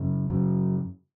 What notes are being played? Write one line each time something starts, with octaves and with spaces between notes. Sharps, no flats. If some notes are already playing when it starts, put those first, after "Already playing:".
Already playing: F#2 C#3
F#2 C#3 F#3